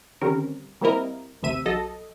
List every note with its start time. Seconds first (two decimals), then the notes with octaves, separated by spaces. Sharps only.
0.21 D3 D#3 G3 C4 C#4 A#4
0.81 G3 A#3 C4 E4 A#4 D#5
1.42 A1 D#2 C3 E5 D#7
1.65 B1 F#3 A4 D#5